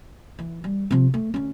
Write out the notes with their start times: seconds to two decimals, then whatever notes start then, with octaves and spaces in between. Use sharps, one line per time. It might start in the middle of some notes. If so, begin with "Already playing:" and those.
0.39 E3
0.64 G3
0.91 C3 F3
1.14 A3
1.34 D2 C#4